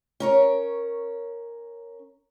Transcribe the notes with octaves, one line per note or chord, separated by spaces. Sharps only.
C#4 A#4 C#5